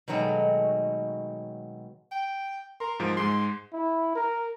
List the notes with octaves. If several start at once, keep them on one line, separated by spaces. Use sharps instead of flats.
B2 D#3 F#3 G#3 A3
G5
A#4 C6
G#2 F3 D7
G#2 G#3 C6
E4
A#4